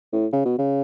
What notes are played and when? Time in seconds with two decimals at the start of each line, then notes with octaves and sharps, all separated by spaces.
0.13 A2
0.33 C#3
0.45 B2
0.58 C#3